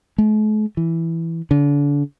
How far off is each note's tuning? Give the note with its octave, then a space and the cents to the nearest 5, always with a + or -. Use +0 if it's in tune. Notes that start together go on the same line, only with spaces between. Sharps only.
A3 -45
E3 +5
D3 -35